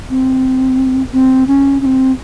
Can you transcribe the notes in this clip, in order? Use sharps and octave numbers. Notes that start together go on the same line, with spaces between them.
C4
C4
C#4
C#4
C4